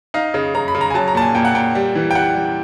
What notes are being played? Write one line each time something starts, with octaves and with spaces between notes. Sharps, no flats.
D#4 F5
C#3
C#3 A#5
B5
C#3
A#5
G#5
F#3 A5
A#5
A#2 A5
G#5
A#2 G5
F#5
A#2 G5
G3
E3
G5
G3 F#5
G3